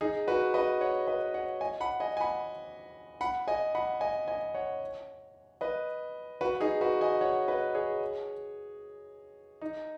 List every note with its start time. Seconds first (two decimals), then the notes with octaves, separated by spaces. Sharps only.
0.01 D#4 G#4
0.27 F#4 B4
0.54 B4 D#5
0.81 C#5 F#5
1.07 B4 D#5
1.34 C#5 F#5
1.61 D#5 G#5
1.81 F#5 B5
2.00 D#5 G#5
2.17 G#5
2.20 F#5 B5
3.21 F#5 B5
3.48 D#5 G#5
3.75 F#5 B5
4.01 D#5 G#5
4.28 D#5 G#5
4.54 C#5 F#5
5.61 B4 D#5
6.41 F#4 B4
6.60 D#4 G#4
6.81 F#4 B4
7.01 D#5 G#5
7.21 C#5 F#5
7.48 B4 D#5
7.75 G#4 C#5
9.61 D#4